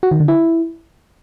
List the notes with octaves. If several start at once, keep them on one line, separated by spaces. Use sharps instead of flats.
F#4
D#3
D3
E4